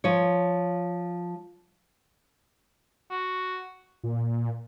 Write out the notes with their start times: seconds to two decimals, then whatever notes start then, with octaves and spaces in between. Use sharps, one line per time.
0.04 F3 C#5
3.11 F#4
4.04 A#2